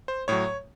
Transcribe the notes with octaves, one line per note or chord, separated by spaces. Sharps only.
C5
A2 F#3 C#5